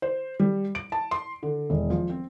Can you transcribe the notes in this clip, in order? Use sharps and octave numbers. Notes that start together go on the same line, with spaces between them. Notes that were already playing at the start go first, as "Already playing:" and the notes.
C5
G3
D7
A5
C6
D3
E1
F3
C4